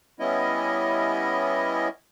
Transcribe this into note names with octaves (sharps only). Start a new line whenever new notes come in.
G3 B3 C#4 E4 D#5